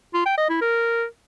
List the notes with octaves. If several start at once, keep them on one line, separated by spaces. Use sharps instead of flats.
F4
G5
D#5
E4
A#4